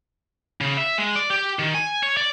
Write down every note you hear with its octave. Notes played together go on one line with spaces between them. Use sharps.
C#3
E5
G#3
D5
G4
D#3
G#5
C#5
D5